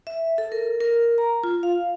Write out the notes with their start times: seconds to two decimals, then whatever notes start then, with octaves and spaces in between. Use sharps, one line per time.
0.07 E5
0.38 A4
0.52 A#4
0.81 A#4
1.18 A#5
1.44 F4
1.63 F5